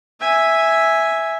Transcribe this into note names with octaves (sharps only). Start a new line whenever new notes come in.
E5 G#5